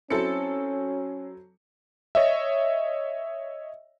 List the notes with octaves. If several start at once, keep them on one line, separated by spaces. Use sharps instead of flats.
F#3 C4 C#4 E4 A4 C#7
C#5 D#5 E5